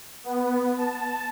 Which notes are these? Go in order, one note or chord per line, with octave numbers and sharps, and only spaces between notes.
B3
A5